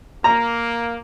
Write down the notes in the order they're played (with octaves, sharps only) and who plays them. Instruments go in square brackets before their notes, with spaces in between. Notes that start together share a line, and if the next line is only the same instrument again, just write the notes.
[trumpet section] A#3 [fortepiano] A#5